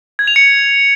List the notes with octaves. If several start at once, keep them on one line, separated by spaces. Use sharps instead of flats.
G#6
F7
C#7